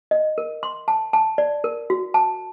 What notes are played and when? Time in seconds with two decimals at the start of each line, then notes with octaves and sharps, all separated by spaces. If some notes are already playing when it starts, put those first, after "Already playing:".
0.11 D#5
0.38 A#4
0.63 C6
0.88 A5
1.13 A5
1.38 D5
1.64 A#4
1.90 F#4
2.14 A5